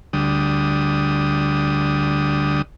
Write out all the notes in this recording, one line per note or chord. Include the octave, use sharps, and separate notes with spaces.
D2 D3 G3 D#6